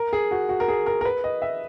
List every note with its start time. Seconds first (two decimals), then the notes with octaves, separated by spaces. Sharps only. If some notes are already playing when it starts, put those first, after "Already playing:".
Already playing: A#4
0.13 G#4
0.31 F#4
0.49 F#4
0.60 A#4
0.68 G#4
0.86 A#4
1.01 A#4
1.05 B4
1.24 D#5
1.42 E5